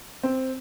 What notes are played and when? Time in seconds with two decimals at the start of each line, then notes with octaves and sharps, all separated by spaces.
0.23 C4